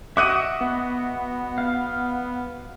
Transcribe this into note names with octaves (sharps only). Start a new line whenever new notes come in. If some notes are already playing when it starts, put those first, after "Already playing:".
F#4 D#5 E5 F#5 D6 E6 F#6 D#7
B3
F5